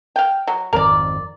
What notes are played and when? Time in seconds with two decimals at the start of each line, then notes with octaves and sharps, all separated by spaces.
0.16 F5 G5
0.47 F#3
0.73 G#1 F2 D#3 A#4 D5